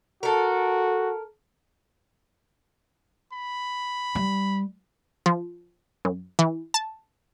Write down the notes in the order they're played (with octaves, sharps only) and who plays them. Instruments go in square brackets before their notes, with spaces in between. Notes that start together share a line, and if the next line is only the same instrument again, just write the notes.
[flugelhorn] F#4 [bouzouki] A4 A#4
[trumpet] B5
[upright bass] G3
[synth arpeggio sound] F3
F#2
E3
A5